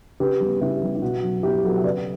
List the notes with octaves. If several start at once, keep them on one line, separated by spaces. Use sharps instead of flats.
C#3 G4 B4
G3 B3
C#3 E4 G4
G3 B3
E4
B2 F#4
F#3 B3
B2 E4 G4
F#3 B3 F#4 A4
E5
C#3 B4 D5